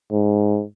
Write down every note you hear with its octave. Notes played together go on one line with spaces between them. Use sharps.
G#2